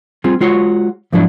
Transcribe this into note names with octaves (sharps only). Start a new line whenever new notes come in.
G3 C4 F4 G#4
G#3 F4 F#4 C#5
G#2 F3 F#3 D4 E4